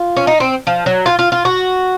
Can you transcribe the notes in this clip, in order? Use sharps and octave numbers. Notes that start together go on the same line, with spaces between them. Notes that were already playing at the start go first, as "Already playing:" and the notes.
Already playing: F4
C#4
D#4
C4
F3
F#3
F4
F4
F4
F#4